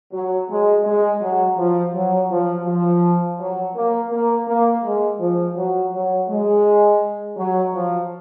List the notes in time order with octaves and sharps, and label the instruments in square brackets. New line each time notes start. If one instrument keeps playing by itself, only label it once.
[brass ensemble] F#3
G#3
G#3
F#3
F3
F#3
F3
F3
F#3
A#3
A#3
A#3
G#3
F3
F#3
F#3
G#3
F#3
F3